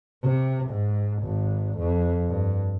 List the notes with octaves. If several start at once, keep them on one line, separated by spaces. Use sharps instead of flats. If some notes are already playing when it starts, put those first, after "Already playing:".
C3
G#2
G#1
F2
G2